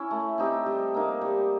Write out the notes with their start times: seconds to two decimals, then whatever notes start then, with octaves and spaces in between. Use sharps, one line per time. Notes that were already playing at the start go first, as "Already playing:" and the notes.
Already playing: C#4 E4
0.11 A3
0.38 C4 D#4 G4
0.66 G3
0.94 A#3 D#4
1.21 G3